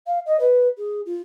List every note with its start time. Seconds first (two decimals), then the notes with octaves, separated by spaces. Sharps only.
0.06 F5
0.26 D#5
0.39 B4
0.77 G#4
1.05 F4